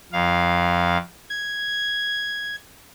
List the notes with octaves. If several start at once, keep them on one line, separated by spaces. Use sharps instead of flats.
F2 F5
G#6